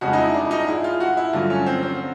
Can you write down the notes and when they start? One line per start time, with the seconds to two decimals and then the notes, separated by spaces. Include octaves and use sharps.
0.01 F2 C#3 F3 G#3 F#4
0.13 D#4
0.18 E4
0.34 D4
0.51 D#4
0.67 G#2 F3 G#3 E4
0.84 F4
1.00 F#4
1.17 E4
1.33 G2 D3 F#3 A3 F4
1.50 C#4
1.66 C4
1.83 C4